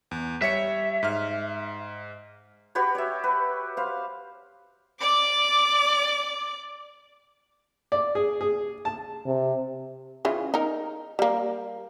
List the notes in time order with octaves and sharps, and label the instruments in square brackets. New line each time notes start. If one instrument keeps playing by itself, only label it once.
[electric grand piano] E2
[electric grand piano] G3 C#5 C#7 [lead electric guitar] E5
[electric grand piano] G#2 F6
[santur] F#4 G4 B4 C#5
C#5 E5
B4
C5 F5
[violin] D5 D6
[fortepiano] D5
G#4
G#4
A5
[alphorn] C3
[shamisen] C#3 E3 F4
D#4 A#4
G3 A#3